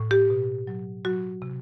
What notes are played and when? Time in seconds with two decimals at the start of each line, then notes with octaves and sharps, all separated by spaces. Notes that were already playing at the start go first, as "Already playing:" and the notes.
Already playing: A2
0.11 G4
0.30 B2
0.67 F#3
1.05 F#3 F#4
1.42 C3